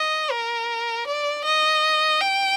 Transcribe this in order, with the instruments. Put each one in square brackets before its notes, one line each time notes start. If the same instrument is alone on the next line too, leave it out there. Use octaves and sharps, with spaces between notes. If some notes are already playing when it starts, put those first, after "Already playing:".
Already playing: [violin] D#5
A#4
D5
D#5
G5